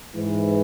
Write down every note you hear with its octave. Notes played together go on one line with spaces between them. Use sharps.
G#2 E3